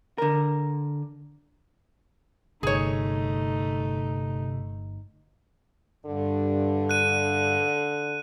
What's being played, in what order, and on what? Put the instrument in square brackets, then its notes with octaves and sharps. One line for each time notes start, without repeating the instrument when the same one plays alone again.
[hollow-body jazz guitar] D3 A#4
[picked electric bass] G1 [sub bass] C3 [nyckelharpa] A3 D#4 [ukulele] G#4 C#5
[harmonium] G2 [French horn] D3
[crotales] F#6 D#7